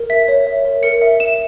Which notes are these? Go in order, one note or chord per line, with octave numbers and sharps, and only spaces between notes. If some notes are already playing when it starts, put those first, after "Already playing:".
Already playing: A#4
E5 B6
C#5
E5
A#4
A#4 C#7
E5
E5 E7